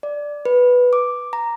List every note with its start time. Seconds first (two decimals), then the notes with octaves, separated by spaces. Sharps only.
0.03 D5
0.45 B4
0.93 D6
1.33 A#5